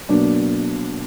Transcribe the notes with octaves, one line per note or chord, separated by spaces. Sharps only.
B2 F#3 A#3 D4